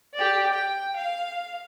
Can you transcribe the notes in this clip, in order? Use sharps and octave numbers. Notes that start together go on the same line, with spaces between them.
G4 D5
G5
F5